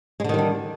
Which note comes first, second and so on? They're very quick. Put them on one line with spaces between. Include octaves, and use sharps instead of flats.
G#3 D3 D#3 G3 D4